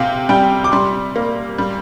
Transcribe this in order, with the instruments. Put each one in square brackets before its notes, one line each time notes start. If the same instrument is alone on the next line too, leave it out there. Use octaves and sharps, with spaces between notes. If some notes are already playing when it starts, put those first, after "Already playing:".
Already playing: [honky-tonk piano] C3 [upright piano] F5 G5
[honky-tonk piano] G3 [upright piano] G5
[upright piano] D6
[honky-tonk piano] G3 [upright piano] C6
[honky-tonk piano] A#3
G3